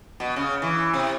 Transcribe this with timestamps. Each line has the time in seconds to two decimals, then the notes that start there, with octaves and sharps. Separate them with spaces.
0.20 B2
0.36 C#3
0.62 E3
0.94 C3